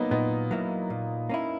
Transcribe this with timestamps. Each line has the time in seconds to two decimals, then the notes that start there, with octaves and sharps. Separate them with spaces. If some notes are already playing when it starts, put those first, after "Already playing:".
Already playing: F#3 A#3 B3 D#4
0.11 A#2 B3 D#4
0.51 F#3 A#3 E4
0.90 A#2
1.29 A#3 C#4 E4